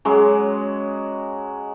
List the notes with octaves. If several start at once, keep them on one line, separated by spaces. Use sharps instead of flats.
F#3 G#3 C#4 D6